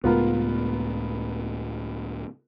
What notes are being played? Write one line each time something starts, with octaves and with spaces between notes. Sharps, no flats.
C#2 A2 G#3 B3 F4 A#4